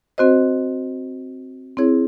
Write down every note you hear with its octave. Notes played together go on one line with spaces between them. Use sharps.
C4 F#4 C5 D#5
C4 E4 G#4 C#5